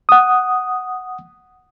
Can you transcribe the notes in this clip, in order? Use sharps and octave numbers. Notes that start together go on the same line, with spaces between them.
F#5 D#6